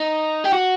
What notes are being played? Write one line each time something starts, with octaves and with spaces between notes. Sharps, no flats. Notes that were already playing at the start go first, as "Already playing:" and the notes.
Already playing: D#4
G4
F#4